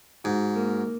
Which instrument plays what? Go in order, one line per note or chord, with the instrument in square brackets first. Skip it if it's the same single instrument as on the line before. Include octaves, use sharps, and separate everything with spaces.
[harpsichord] G#2 [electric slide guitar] F#4
[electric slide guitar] A#3